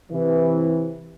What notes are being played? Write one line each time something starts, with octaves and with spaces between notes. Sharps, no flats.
C3 E3